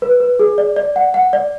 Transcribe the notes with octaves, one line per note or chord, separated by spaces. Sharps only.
B4
B4
G#4
D5
D5
F#5
F#5
D5